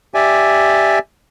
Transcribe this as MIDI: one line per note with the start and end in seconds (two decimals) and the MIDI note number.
0.14 0.99 67
0.14 0.99 74
0.14 0.99 76
0.14 0.99 80